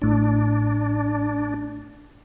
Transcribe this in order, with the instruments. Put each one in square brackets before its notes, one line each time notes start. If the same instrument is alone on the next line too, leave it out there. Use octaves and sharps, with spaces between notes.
[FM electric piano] A1 A2 [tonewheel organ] D4